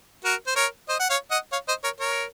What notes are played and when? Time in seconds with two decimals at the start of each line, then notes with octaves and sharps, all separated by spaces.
0.24 F#4 A#4
0.47 C5
0.56 A#4 C#5
0.89 C5 D#5
1.00 F#5
1.10 C#5 F5
1.31 D#5 F#5
1.52 C#5 F5
1.68 C5 D#5
1.84 A#4 C#5
2.00 A#4 C#5